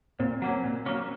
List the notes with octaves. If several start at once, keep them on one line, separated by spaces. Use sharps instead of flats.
A#2 C4
F#3 A#3 C#4
A#2
F#3 A#3 C#4